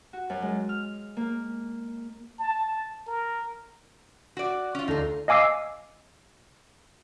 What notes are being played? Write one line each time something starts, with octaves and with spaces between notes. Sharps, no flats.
F#4
F#2
G#3
F6
A#3
A5
A#4
F#4 D5
C#4 F4
D2 D#4 F4 A4 C7
D#5 F5 G#5 D6 E6 C7